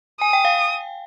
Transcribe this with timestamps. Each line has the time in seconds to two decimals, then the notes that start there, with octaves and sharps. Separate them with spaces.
0.21 G#5 D#6
0.33 G5
0.45 F5